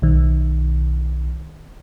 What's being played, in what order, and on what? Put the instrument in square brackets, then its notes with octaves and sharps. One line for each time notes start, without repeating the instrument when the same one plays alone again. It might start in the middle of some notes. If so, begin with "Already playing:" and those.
[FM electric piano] B1 D#3